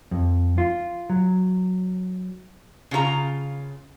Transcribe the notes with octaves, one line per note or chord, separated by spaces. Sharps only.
F2
F4
F#3
C#3 F4 G4 A#5